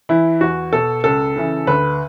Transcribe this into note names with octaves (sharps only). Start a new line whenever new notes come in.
E3 E4
E2 F#4
B2 A4
C#2 A4
C#3 E3
D2 B4